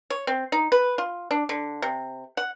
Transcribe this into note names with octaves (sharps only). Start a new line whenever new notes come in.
C#5
C4
D#4
B4
F4
D4
D3
C3
F#5